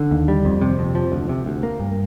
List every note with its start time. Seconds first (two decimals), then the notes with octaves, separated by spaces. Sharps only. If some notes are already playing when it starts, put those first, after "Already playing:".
Already playing: D3
0.11 D#2
0.28 G3
0.45 F2
0.61 C3
0.79 F2
0.95 F3
1.12 D2
1.29 C3
1.46 D2
1.63 A#3
1.80 G2